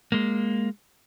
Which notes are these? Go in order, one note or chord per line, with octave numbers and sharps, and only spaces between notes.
G#3 A#3